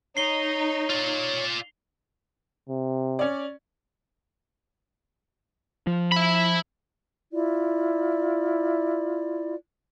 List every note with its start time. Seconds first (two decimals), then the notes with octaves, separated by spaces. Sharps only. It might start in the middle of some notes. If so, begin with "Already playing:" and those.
0.17 D#4 C#5 C7 G7
0.90 F4 D5
2.69 C3
3.19 C#4 D5
5.87 F3
6.12 E5 B5
7.33 E4 F4 D5